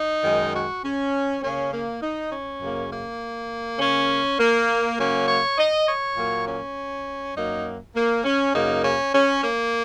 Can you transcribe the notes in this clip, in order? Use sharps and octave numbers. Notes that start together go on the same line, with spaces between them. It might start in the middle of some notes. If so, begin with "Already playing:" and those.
Already playing: D#4
F#2 D#3 G#3
F#4
C#4
C#3 A#3 C#4
A#3
D#4
C#4
F#2 C#3 A#3
A#3
C#3 A#3 C#4
A#3
C#3 F#3 A#3 C#4
C#5
D#5
C#5
A#2 F#3 A#3
C#4
F#2 F#3 A#3 D#4
A#3
C#4
F#2 C#3 A#3 D#4
C#4
C#4
A#3